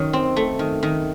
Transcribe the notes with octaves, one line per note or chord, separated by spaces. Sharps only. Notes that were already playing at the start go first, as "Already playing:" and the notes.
Already playing: F#2 D#3 D#4 C#5
C4
A3
D#3
D#3